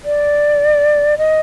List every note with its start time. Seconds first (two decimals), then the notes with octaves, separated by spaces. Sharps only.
0.05 D5
1.18 D#5